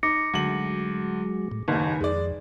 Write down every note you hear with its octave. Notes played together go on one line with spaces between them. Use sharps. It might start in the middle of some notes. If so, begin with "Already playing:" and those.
D#4 D6 A#6 C#7
D2 F#3 G#3 F#7
A2
F#1 D#2 D#3 D#4 B4 G#5
F2 G#3 D5